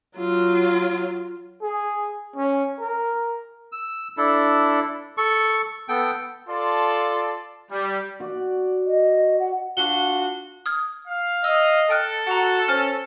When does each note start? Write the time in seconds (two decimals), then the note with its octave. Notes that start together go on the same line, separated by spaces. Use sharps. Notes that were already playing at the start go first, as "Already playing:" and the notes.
0.17 F#3 F4
1.62 G#4
2.36 C#4
2.80 A#4
3.72 E6
4.17 D4 E4 A4
5.17 A4 C#6
5.89 B3 A4 G5
6.49 F4 A4 D5 A5 C6
7.71 G3
8.20 F#4 D5
8.87 D#5
9.40 F#5
9.77 D4 F4 F#4 G7
10.66 D#6 F6 G#6
11.07 F5
11.44 D#5 E6
11.91 A4 G5 F6 F#6
12.27 F#4 F#5 A#5
12.68 C#4 C5 G#5 F6